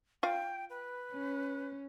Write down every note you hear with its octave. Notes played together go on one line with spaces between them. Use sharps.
F4 F5 G5
B4
C#4